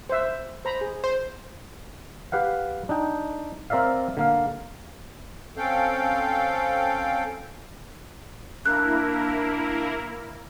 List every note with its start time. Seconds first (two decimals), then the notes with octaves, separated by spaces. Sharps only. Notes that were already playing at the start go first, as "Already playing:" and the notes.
0.09 C5 E5
0.65 C5 A#5 B5
0.81 G#4
1.04 C5
2.32 G4 B4 F5 F#5
2.89 D4 D#4 G5
3.70 C4 A#4 D5 E5 F5
4.17 D3 A#3 F5
5.57 C4 C#4 A4 F5 G5
8.66 A#3 D4 E4 A#4 F#6